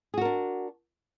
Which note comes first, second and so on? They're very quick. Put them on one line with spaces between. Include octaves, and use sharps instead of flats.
G#4 F#4 A#4 D4